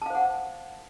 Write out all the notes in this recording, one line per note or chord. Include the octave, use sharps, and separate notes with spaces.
C5 F5 F#5 A5